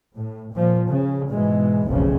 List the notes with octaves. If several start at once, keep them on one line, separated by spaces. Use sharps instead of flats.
A2
A#2 F3
C#3
G#2 B2 E3 G#3
F1 B1 E2 C#3 F3